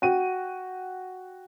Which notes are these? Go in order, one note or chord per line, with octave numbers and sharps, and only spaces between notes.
F#4 G5 D#7